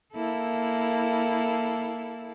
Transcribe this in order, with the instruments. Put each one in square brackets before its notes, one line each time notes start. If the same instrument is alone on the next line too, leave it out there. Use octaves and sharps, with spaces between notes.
[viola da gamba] A#3 E4 A4